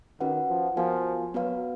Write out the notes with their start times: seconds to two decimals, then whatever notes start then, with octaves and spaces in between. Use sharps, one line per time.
0.20 D#3 C#4 F#4 B4 F#5
0.49 F3
0.77 F3 B3 F#4 A#4 F5 G#5
1.33 F#3 B3 F#4 B4 F5